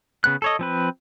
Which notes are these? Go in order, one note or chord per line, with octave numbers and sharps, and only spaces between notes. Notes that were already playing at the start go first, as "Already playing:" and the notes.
C#3 B3 F#6
A4 C#5 D#5
F3 C4 B4